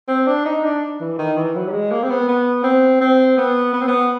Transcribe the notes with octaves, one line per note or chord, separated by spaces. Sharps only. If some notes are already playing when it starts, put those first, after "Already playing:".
C4
D4
D#4
D4
E3
D#3
E3
F#3
G3
G#3
A#3
C4
B3
B3
C4
C4
B3
B3
C4
B3